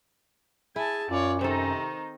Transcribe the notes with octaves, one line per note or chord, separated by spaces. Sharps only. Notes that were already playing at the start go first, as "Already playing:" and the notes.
E4 G#4 G#5 A5
F#2 F4 C#5 D5
C3 D#3 C4 D#4 A4